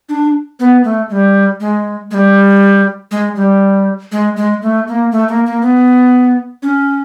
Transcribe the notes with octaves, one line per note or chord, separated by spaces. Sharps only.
D4
B3
A3
G#3
G3
G#3
G#3
G3
G#3
G3
G#3
G#3
A3
A#3
A3
A#3
A#3
B3
C#4